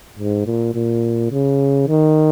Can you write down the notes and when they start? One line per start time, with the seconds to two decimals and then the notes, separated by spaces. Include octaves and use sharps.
0.19 G#2
0.46 A#2
0.75 A#2
1.31 C#3
1.88 D#3